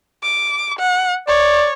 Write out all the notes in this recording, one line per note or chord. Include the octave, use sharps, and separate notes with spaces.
D6
F#5
C#5 D5